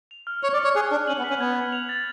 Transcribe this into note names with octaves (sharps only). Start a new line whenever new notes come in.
F7
F6
C#5 F7
D5
C#7
C#5
G#4 F#6
D4 F#6
C#4 F#7
B3
B6
C#4
B3 G#6
G#6
F7
A6